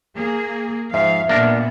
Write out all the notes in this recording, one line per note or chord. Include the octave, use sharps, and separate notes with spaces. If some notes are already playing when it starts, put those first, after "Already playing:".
A#3 G#4
G#2 F3 E5 F5
A#2 A#3 B3 D4 A#4